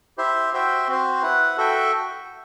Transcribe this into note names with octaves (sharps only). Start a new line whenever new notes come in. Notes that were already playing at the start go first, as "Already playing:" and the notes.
E4 G4 C5 E5
F#4 C5 E5 G5
C4 F#4 C5
E4 B4 F#5
F#4 A4 E5 G5